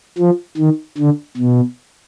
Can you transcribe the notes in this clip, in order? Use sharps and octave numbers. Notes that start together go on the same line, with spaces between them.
F3
D#3
D3
B2